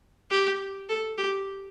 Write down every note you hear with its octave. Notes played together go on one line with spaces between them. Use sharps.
G4
A4
G4